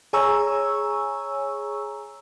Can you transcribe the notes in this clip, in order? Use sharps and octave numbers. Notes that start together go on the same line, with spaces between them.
G#4 C#5 G#5 A#5 C#6 E6